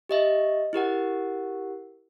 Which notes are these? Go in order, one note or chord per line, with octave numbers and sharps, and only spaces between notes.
G4 D#5 E5
E4 G4 A#4 F#5